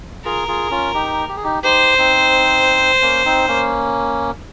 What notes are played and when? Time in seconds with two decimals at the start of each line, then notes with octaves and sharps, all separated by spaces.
0.25 F4 G#4 A#4
0.48 F4 G#4
0.71 C#4 F4
0.94 D#4 G4
1.29 G4
1.36 G#4
1.44 D#4 G4
1.63 D#4 G4 C5
1.98 C4 D#4
3.02 A#3 C#4
3.25 C4 D#4
3.48 A#3 C#4